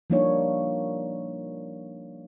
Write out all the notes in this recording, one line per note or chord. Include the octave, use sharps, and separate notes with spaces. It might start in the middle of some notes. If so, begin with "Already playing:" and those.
F3 G3 A#3 D4 D#4 C#5